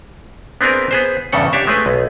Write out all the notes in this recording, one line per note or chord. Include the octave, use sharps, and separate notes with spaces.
B3 C4 D4 G#4 A#4
B3 G#4 C5
E2 G2 C#3 A4 F#5
D4 G4 C#5 E5
G#3 A3 G#4 B4
B1